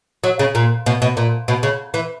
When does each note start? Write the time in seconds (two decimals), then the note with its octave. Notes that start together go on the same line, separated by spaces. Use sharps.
0.24 F#3
0.39 C#3
0.55 A#2
0.86 B2
1.02 B2
1.17 A#2
1.48 B2
1.63 C#3
1.94 E3